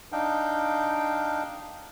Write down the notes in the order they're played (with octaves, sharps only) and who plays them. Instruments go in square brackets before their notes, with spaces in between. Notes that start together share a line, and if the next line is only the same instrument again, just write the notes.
[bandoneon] D4 D#4 F5 G5